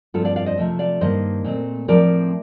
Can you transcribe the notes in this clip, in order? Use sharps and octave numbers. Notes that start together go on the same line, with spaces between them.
G2 F3 C4 F4 A4
D5 F5
D5 F5
C5 D#5
C3 F3 A3 C4
D5 F5
G2 D#3 A#3 C5 D#5
A#2 A3 C4
A2 F3 C4 A#4 D5